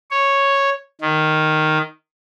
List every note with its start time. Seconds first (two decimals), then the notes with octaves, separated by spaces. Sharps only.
0.11 C#5
1.01 D#3